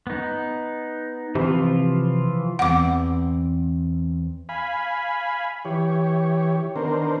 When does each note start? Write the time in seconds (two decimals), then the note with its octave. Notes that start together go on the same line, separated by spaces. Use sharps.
0.07 B3 D#4
1.35 C3 E3 F3 F4
2.59 E2 C4 F#5 D6
4.49 F5 G#5 B5
5.65 E3 G4 C#5
6.76 D#3 B3 D4 A#4 C5